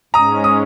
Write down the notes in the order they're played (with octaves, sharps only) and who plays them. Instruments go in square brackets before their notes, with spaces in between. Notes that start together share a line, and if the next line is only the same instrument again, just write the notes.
[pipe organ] G#2 G#3 C#4 [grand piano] A#5 D#6
[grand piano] D#6